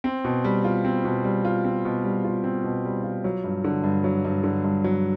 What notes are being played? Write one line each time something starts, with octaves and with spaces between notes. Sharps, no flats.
C4
B2
G3
F4
C4
B2
G3
F4
C4
B2
G3
F4
C4
B2
G3
F4
F#3
G2
D3
G2
F#3
G2
D3
G2
F#3